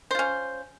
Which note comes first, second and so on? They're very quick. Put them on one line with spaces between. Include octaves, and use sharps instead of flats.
C5 F4 C#4